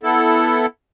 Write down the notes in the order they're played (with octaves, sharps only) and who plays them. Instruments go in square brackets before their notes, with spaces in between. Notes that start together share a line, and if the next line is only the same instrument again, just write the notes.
[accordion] B3 E4 A4